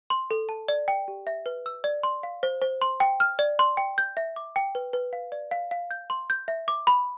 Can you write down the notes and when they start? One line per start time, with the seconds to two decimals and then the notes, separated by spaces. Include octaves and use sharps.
0.10 C6
0.31 A4
0.49 A5
0.68 D5
0.88 G5
1.08 G4
1.27 E5
1.46 B4
1.66 E6
1.84 D5
2.03 C6
2.23 F5
2.43 C5
2.61 C5
2.82 C6
3.00 G5
3.20 F6
3.39 D5
3.59 C6
3.77 G5
3.98 G6
4.17 E5
4.36 D6
4.56 G5
4.75 B4
4.93 B4
5.13 F5
5.32 D5
5.51 F5
5.71 F5
5.91 G6
6.10 C6
6.30 G6
6.48 E5
6.68 D6
6.87 B5